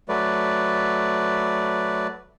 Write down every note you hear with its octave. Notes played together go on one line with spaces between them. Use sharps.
F#3 A3 B4 D5